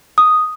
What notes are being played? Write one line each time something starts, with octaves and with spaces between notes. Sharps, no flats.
D#6